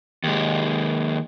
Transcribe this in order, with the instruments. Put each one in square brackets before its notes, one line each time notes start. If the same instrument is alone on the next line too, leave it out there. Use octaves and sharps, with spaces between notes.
[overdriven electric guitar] D#2 G#3